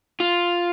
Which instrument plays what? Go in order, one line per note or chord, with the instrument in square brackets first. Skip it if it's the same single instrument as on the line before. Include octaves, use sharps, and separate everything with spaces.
[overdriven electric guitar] F4